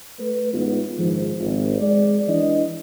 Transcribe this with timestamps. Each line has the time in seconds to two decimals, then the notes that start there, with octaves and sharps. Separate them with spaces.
0.19 A3 B4
0.53 A1 G#3 B3 D#4 F4
0.98 A#1 G#2 D#3 F3
1.39 G#1
1.80 G#3 D5
2.28 E3 D4 D#5